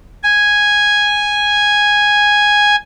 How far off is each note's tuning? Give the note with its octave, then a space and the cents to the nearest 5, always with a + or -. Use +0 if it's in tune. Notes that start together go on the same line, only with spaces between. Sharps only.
G#5 -5